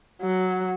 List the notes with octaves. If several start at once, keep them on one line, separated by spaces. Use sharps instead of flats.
F#3